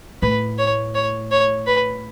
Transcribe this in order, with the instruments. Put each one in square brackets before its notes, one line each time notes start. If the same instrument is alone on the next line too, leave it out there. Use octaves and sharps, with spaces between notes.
[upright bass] A2 [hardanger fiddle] B4
[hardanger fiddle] C#5
C#5
C#5
B4